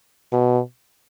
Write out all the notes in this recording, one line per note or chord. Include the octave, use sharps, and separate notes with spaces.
B2